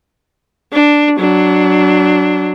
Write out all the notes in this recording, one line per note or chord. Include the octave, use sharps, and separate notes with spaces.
D4
F#3 D4